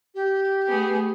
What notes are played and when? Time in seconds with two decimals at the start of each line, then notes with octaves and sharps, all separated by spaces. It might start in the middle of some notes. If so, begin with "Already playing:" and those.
0.15 G4
0.68 A3 B3 G#4